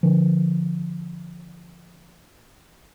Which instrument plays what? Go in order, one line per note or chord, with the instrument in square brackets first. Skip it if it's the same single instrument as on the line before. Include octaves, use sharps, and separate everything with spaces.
[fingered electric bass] D3 F3